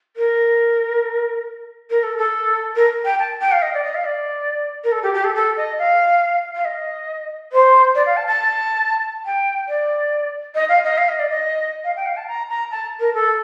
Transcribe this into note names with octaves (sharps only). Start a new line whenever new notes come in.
A#4
A#4
A4
A4
A#4
G5
A5
G5
F5
D#5
D5
D#5
F5
D5
A#4
A4
G4
G4
A4
A4
D#5
F5
F5
D#5
C5
D5
F5
A5
A5
G5
D5
D#5
F5
D#5
F5
D#5
D5
D#5
F5
G5
F5
A5
A#5
A#5
A5
A#4
A4